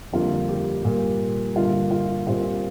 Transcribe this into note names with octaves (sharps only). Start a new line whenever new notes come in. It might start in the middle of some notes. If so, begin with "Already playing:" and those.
F2 D3 G3 A#3 F4
G4
A#2 G3 A#3
G2 D3 A#3 F4
F4
A#2 G3 C4 F4